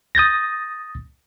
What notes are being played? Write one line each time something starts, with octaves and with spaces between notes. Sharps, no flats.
D#6 G6 A6 A#6